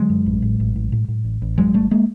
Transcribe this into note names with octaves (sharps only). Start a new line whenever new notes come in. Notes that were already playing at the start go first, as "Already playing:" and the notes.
Already playing: D3 F#3 G#3
F#2
A1
A2
A1
A2
A2
A2
A1
A1
F#2 F#3 G#3
G#1 G3 A3
G#3 A#3